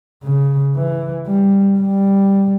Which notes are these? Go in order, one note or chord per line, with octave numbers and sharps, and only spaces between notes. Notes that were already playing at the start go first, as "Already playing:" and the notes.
C#3
E3
G3
G3